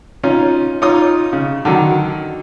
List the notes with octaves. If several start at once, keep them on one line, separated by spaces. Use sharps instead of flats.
C#4 D#4 F4
D#4 F4 C#5 D#6
C#3
D3 D#3 F#3